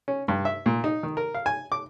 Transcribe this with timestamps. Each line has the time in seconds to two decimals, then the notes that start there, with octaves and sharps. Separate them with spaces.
0.08 C#4
0.28 G2
0.45 E5
0.66 A#2
0.84 D#4
1.03 D#3
1.17 A#4
1.35 F5
1.46 G#5
1.72 D6